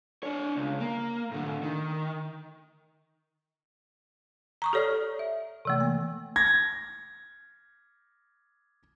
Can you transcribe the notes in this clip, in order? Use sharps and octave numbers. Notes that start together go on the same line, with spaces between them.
D4 C#5
C#2
A#3
A2 D3
A2 D3
D#3
A#5 C#6 D#6
G4 A4 C#5 D5 F6
E5
C3 E3 A3
A#3
G#6 A#6